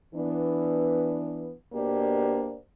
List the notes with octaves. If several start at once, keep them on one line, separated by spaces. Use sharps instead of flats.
E3 B3 D4
B2 A#3 D4 G4 C5 D5